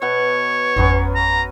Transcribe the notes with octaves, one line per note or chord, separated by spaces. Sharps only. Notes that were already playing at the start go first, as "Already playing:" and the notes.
B2 B3 C#5 F#5
G#1 F2 F#3 B3 C#4
A#5